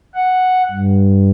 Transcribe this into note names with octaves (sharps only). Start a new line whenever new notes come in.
F#5
G2